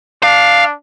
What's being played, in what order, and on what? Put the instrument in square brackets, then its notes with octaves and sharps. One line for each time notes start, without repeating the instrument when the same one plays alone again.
[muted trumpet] D4 [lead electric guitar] F5